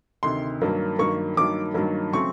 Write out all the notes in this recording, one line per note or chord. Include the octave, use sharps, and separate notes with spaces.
D2 C3 D#3 C6
G2 D#3 F#3 A#3
G2 D#3 F#3 A#3 C#6
G2 D#3 F#3 A#3 D6
G2 D#3 F#3 A#3
C#3 F#3 A3 C4 C#6